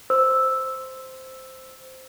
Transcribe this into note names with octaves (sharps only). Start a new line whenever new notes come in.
C5 E6